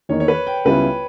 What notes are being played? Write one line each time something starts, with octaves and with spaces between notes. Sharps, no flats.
E2 D#3 A#3 D#4 C#5
C#5
B4
G5
C#2 C#3 G3 B3 E4 B4